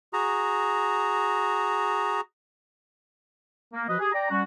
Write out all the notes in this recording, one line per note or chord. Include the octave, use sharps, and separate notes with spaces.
F#4 G#4 A#5
A#3
F3 F#4 B4 D#5
G4 G#4
D5 G5 A#5
G3 C#4 F#4